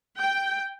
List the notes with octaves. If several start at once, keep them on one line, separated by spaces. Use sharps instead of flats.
G5